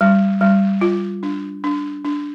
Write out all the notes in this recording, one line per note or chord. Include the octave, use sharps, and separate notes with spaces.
G3
G3
F4
D4
D4
D4